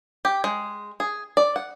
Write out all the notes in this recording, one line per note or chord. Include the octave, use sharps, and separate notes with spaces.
G4
G#3
G#4
D5
F#5